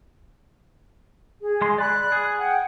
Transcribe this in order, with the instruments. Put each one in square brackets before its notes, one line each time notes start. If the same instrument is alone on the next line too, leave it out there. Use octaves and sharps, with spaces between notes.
[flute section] G#4
[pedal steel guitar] G#3 C6
[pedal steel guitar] D5 B5 [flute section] F#6
[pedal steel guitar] G#4
[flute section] F#5 G5